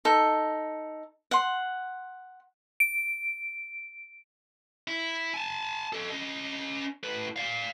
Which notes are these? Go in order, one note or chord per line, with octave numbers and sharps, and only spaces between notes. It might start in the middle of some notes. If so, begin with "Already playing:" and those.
D#4 A4
F#5 C6
D7
E4
G#5 A5
A4 D#5
C#4 D#5
A2 B4
D5 F5